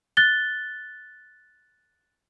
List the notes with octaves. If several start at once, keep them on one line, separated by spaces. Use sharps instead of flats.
F#6 A6 G7